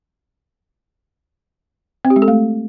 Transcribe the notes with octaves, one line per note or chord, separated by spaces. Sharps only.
C4
G4
G#3
A4
A3